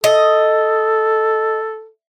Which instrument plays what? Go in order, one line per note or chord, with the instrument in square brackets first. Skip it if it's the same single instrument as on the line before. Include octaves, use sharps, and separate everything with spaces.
[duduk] A4 [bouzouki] D#5